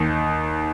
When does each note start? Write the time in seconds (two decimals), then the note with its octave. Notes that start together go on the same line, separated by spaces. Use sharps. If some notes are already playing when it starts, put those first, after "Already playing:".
Already playing: D#2 D#4